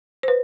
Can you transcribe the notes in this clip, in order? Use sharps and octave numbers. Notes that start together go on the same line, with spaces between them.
C5
B4